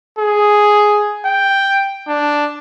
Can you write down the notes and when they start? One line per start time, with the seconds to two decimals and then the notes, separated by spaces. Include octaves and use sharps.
0.19 G#4
1.26 G5
2.08 D4